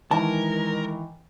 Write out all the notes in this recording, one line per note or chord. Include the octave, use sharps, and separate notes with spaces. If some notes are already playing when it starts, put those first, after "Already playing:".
D#3 E3 G#3 A#4 A5